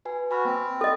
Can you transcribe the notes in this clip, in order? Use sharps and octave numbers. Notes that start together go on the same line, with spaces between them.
F#4 B4 G#5
F#4 G#5 B5 F6
A#3 C4
A4 D#5